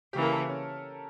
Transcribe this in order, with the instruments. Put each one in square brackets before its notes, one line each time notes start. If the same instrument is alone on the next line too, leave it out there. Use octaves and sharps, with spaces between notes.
[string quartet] C#3 E3 A#3 [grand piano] G4
[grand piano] A#4
A4
C#4